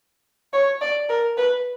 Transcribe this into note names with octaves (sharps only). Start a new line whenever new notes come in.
C#5
D5
A#4
B4